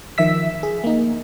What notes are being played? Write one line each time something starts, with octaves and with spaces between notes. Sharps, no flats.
D#3 F3 E5 E6 B6
G#4
A#3 D#4